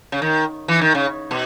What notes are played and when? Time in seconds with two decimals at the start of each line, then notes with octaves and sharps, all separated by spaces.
0.12 C#3
0.22 D#3
0.68 E3
0.81 D#3
0.95 C#3
1.31 B2